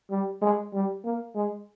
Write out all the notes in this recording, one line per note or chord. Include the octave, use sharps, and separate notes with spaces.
G3
G#3
G3
A#3
G#3